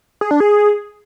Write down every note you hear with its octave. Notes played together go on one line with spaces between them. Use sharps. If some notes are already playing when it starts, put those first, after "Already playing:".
G#4
D4
G#4